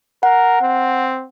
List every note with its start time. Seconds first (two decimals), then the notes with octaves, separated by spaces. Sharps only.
0.23 A#4 F#5
0.62 C4